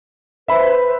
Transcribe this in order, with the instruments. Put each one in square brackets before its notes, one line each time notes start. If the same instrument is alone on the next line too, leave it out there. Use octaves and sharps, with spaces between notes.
[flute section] B4 C5 [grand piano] E5 B5